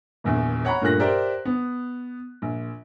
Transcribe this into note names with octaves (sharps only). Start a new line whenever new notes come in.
D#1 A#1 E2
C#5 F#5 A#5 B5
G2 A#2 A3 F#6 A#6
G4 A#4 C5 D5 E5
B3
A#1